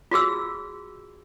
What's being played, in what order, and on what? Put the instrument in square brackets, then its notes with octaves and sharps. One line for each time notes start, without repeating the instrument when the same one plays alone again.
[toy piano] F4 F#4 G#4 E6